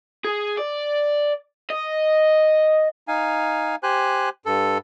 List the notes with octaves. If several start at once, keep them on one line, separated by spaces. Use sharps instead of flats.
G#4
D5
D#5
D#4 F5 G#5
G4 C5 G#5 F#6
G2 A4